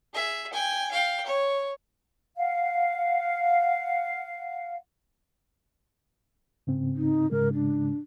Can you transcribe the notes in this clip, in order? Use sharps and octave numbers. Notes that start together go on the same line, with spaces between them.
G#4 E5
G5 G#5
F5 G5
C#5
F5 F#5
G#2 C#3 C4
D#4
G#2 C#3 G#3 A#4
D4